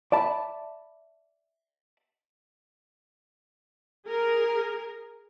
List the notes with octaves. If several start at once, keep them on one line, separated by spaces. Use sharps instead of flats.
D5 E5 A5 B5
G#4 A#4